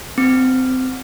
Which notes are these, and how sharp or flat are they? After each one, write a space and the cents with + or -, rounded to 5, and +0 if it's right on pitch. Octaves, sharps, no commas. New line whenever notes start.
C4 -20